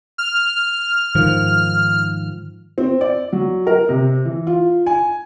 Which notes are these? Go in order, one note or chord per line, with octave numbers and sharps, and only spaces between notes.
F6
G#2 D#3 F3
C4
D5
F#3
A#4
C3
E3
F4
G#5